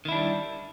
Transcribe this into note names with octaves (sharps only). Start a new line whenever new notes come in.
D#3 G3 D4 E4